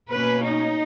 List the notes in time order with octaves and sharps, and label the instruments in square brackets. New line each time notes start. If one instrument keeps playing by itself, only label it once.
[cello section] B2 A#3 C#4 B4
D#4